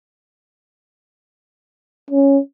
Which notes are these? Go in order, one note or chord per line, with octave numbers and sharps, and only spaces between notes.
C#4